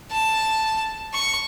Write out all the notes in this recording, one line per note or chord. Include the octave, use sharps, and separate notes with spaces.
A5
C#6